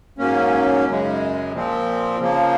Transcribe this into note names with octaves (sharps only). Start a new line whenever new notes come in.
G#2 F#3 A#3 C#4
F#2 C#3 G#3
A#2 F3 C4
C#3 F3 A#3